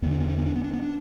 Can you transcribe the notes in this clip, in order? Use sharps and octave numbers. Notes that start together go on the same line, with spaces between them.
E2 D3 B3
D4
B3
D4
B3
D4
B3
D4
B3
D4